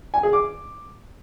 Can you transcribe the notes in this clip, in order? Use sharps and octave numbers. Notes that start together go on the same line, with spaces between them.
G#5
G#4
D6